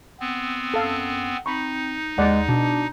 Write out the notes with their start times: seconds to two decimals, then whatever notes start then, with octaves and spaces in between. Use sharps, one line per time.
0.20 B3 C4
0.74 F#2 A4 F5
1.46 C4 D#4 B5 C#6
2.18 D#2 G#3 G#4 D5 F#5
2.49 B2 D4